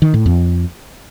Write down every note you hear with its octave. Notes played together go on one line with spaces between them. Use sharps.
D#3
A2
F2